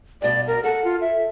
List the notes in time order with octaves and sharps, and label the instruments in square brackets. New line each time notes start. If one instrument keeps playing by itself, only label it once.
[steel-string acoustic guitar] G2 B2 [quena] D5
[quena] A#4
[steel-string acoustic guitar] A4 [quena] F#5
[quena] F4
E5